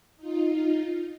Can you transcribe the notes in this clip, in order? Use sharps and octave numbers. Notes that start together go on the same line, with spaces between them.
D#4 F4